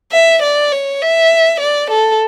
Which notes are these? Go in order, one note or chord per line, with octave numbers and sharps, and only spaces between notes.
E5
D5
C#5
E5
D5
A4